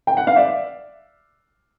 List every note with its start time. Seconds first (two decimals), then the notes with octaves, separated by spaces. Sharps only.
0.07 G5
0.17 F#5
0.27 F5
0.36 D5 E5